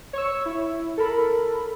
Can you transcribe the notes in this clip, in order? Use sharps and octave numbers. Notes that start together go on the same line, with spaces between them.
C#5 C#6 E6
E4
A4 A#4 B5